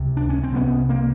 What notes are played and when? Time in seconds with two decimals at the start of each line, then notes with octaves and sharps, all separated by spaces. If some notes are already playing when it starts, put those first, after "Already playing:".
Already playing: C#2 C3
0.17 D4
0.30 C#4
0.44 C4
0.52 C2 C3 B3 C#4
0.89 A#3 C4